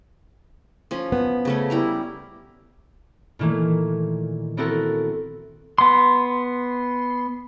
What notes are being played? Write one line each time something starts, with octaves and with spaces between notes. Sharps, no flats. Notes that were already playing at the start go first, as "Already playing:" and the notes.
F3 C#4
B3
C#3 A3 C#4
G3 E4 A#5
A#2 D#3 E3 A3 A#3
B3 C4 E4 F#4 A4 A#4
B3 C6